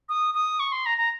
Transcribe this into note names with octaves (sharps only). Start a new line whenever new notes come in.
D#6
D#6
C#6
C6
A#5
A#5